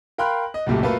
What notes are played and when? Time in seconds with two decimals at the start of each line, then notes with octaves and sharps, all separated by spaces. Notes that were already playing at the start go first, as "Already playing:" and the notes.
0.18 A#4 F5 G5 B5 C6 F#6
0.54 D#5
0.67 C#2 F#2 A#2 G3 A3
0.83 F#3 A3 A#3 F4 A4 B4